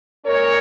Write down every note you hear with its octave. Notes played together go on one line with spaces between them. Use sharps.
A#2 G#3 C#4 A#4 C#5